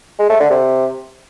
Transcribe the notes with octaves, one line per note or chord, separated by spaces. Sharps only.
G#3
A3
D3
C3